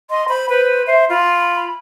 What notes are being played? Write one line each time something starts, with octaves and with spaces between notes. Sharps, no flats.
D#5 C6
C5 B5
B4 C5
C5 E5
F4 B5